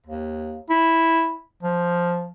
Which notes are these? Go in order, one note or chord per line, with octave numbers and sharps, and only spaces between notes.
D#2
E4
F3